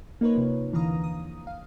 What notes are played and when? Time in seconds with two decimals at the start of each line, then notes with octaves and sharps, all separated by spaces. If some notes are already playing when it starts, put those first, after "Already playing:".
0.21 A#3 D#4 A#4 B4 C#5
0.35 C3 F3
0.72 D#2 D3 E3 F5 A#5 D#6
1.04 D#6
1.47 F5